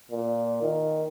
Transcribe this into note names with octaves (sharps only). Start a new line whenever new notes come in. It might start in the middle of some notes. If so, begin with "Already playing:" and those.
A#2
D#3